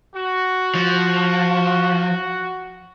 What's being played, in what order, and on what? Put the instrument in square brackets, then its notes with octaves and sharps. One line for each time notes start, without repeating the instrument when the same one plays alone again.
[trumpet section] F#4
[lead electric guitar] F3